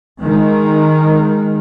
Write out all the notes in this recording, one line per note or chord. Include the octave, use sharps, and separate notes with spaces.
D#3 G#3